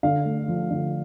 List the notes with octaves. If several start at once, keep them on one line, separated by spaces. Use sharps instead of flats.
D3 F5
A3
F3
D3